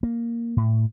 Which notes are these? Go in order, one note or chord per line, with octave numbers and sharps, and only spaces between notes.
A#3
A2